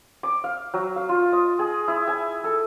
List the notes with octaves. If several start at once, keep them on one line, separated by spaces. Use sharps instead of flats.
D6
F5
F#3
F5
F4
D#5
G#4
E4
G#5
A4